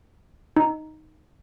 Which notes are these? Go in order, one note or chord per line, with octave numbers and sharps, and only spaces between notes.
D#4